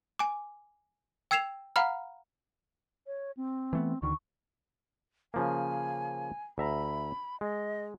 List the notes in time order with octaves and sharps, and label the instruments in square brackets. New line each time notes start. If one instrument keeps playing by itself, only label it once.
[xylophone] G#5 D6
G5 E6 G#6 C7 E7 F7
F5 F#5 A#5 B5 F6
[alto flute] C#5
C4
[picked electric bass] E3 A3 B3
[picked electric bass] D2 D3 D#3 [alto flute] C#6
[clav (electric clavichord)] C#3 F3 A#3 [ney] G#5
[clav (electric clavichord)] D2 E5 A#5 [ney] B5
[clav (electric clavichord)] G#3 [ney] D#5